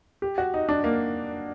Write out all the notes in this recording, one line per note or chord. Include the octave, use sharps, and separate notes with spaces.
G4
F#4
D#4
D4
A#3